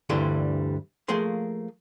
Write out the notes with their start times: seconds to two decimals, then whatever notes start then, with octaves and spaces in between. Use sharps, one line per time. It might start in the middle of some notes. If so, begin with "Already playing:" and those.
0.09 D2 G2 D3 E3 G3 C6
1.08 F3 A3 A#3 G#4 C6